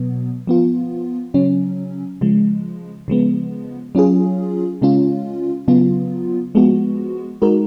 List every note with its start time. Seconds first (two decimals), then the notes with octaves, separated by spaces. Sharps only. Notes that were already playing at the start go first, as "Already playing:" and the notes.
Already playing: B2 F#3 B3
0.47 F3 B3 F4
1.34 C#3 F#3 C#4
2.21 C#3 F3 G#3
3.08 C#3 F3 G#3 B3
3.95 F#3 C#4 F4 G#4
4.82 C#3 G#3 C#4 F4
5.68 C#3 F#3 B3 F4
6.55 F3 G#3 B3 F#4
7.42 G#3 D#4 F#4 A#4